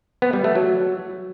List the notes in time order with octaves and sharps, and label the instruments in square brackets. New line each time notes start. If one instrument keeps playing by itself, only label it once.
[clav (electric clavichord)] B3
G3
A3
F#3